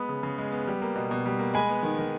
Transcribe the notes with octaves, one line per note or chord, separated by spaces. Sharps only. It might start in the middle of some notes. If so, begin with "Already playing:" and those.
Already playing: G#3 B3 B5 D#6
C#3
C#3
G#3
B3
G3
A#3
B2
B2
G3
A#3
G#3 G#5 B5
B3
D#3
D#3